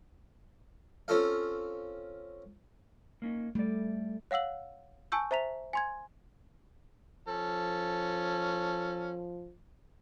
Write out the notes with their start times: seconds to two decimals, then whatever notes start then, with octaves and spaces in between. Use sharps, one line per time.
1.08 C4 C#4 F4 A4 F5
3.22 A#3 C#4 D#4
3.55 G3 A3 D5
4.31 C#5 F5 F#5 E6 F#7
5.12 G#5 A5 C#6 E6 G6
5.31 C5 E5 A#5 B6 F7
5.73 G#5 C6 G#6
7.28 F3 C#4 A4